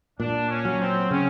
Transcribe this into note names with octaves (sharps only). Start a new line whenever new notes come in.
A#2 D4
C#4
F#3
C4
C#3 C#4